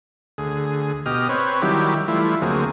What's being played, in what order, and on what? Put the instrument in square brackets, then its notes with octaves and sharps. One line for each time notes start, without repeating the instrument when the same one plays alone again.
[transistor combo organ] D2 G#4
B2 G4 D#5 F6
C4 B4 C#5
D#3 F#3 G3 E4 G4
E3 G3 A3 E4 F4
D2 F#3 A#3 C4 G#4